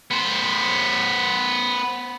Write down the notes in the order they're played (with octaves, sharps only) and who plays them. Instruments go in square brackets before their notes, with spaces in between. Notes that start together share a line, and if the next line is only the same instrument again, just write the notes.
[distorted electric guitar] B3 C5